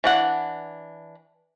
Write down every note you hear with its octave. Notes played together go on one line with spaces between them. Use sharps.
E3 D4 F#5